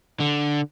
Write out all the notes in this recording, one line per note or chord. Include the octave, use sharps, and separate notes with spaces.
D3